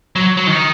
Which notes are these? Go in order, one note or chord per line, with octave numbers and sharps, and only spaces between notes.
F#3
F#3
D#3